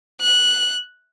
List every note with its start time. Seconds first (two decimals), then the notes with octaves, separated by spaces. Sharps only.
0.21 F#6